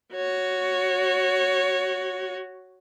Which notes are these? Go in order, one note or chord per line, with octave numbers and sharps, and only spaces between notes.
F#4 C#5